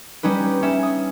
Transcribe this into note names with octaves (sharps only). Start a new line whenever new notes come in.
G3 C#4 D#4 B4
C#4 E5
D#6